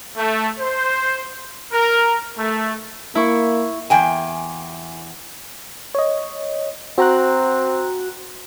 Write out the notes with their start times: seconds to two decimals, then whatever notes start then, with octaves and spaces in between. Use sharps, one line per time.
0.17 A3
0.59 C5
1.73 A#4
2.38 A3
3.15 A#3 E4 C#6
3.90 E2 G5 G#5
5.95 C#5 D#5
6.98 C4 F#4 A#5 F#6